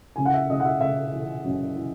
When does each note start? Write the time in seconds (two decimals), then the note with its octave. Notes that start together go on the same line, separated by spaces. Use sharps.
0.16 C#3 G#5
0.25 F#5
0.34 E5
0.50 C#3 D#5
0.60 F#5
0.65 E5
0.81 C#3 E5
1.13 E3
1.44 F#2
1.76 E3